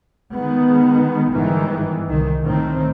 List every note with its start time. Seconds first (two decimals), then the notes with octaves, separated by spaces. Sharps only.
0.35 D#3 G#3 B3
1.31 G1 G#2 D#3 E3
2.07 C2 D#3
2.42 A2 D#3 C4